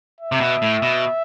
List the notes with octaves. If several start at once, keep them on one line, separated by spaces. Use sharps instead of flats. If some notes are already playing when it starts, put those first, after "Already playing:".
E5
C3
B2
A2
B2